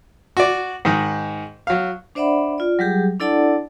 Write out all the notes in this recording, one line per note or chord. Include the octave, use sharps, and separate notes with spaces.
F#4 D5
G#2 D#3
F#3 F5
D4 C5 D5 E5 F#5 B5
F4 D5
F#3 G3 G4 G#4
D4 E4 A4 D5 F#5 A5